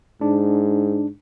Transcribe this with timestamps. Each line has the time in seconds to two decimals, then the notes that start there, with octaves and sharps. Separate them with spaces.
0.21 G#2 D4